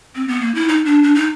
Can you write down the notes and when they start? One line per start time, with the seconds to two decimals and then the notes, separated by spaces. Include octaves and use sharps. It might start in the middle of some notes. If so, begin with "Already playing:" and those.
0.15 C4
0.28 B3
0.42 A#3
0.55 E4
0.68 D#4
0.85 D4
1.03 D4
1.15 D#4